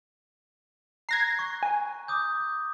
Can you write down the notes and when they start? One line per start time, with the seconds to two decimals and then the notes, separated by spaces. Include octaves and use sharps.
1.09 A#5 F#6 G#6 A#6 C7
1.39 C#6
1.63 G#5
2.08 D6 D#6 G6